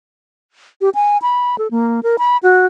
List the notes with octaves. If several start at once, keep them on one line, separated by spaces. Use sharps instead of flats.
G4
G#5
B5
A4
A#3
A#4
B5
F#4